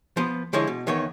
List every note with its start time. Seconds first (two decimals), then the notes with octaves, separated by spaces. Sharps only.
0.17 F3 B3
0.53 D3 F3 G#3 E4 C#5
0.67 B2
0.87 E2 D#3 B3 C#5